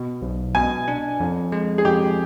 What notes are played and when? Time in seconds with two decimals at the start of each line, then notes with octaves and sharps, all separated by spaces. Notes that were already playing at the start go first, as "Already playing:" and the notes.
Already playing: B2
0.22 B1
0.54 B2 G#5
0.88 D4
1.20 F2
1.52 G#3
1.78 G#4
1.85 F2 G4